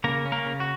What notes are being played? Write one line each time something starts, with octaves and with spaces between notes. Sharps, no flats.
C#3 A#3 A#4
C#4
A#3 A#4
C#3
F#4